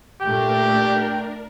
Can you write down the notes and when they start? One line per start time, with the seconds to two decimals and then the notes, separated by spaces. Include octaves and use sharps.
0.21 A#2 A3 D4 G4 A#4 G5